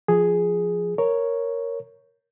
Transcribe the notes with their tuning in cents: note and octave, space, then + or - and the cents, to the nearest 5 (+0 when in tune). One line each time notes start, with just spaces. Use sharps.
F3 +0 G#4 +0
A#4 +0 C#5 +0